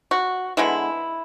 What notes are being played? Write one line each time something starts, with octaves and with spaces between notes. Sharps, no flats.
F#4
D3 G#3 B3 E4